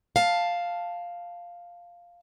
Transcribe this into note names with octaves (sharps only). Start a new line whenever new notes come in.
F5 A5